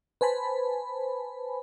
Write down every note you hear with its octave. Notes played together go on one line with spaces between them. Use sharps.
B4 C5 G#5 A5 B5